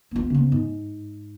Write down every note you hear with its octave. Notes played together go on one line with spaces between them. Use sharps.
B3 F4
C#3 B3
G#2